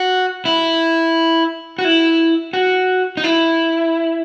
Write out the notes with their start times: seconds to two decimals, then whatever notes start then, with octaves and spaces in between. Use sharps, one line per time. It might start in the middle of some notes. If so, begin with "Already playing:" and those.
Already playing: F#4
0.45 E4
1.79 F#4
1.85 E4
2.53 F#4
3.17 D#4
3.24 E4